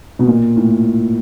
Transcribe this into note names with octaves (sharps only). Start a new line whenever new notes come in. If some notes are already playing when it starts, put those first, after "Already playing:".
B2
A#2
A2